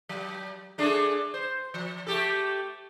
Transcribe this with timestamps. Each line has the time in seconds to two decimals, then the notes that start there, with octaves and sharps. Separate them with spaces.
0.09 F#3
0.78 A3 D4 G#4
1.34 C5
1.74 F3
2.07 A3 G4 A4